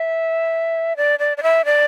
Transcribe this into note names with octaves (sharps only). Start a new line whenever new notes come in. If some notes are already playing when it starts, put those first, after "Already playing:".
Already playing: E5
D5
D5
D5
E5
D5